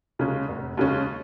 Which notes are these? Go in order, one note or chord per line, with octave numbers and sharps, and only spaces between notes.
D#2 C#3 G#3 C#4
F1
D#2 C#3 G#3 C#4